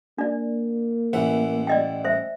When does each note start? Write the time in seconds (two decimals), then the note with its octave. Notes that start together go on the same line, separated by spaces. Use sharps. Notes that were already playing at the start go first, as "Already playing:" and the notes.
0.18 A#3 D4 D5
1.13 A1 E3 F#5
1.67 D5 D#5 G5
2.05 C5 E5